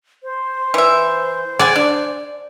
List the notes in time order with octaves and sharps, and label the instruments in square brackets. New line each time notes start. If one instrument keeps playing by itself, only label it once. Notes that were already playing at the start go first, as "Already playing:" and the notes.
[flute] C5
[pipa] E3 E5
[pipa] G#4 F#5 G#5 [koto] D5
[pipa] D4